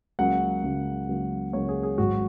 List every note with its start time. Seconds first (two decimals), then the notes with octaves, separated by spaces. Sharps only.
0.19 C#2 C#3 F#3 A#3 F#5
0.63 C#2 C#3 F#3 A#3
1.08 C#2 C#3 F#3 A#3
1.53 C#2 C#3 F#3 A#3 C#5
1.69 G#4
1.83 G#4
1.98 G#1 G#2 F#3 F#4